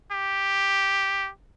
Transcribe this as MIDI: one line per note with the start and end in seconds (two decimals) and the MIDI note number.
0.12 1.30 67